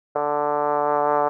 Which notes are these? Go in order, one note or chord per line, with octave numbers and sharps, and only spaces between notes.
D3